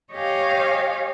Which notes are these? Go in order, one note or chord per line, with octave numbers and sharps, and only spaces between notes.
G4 C#5 D#5 F5 G#5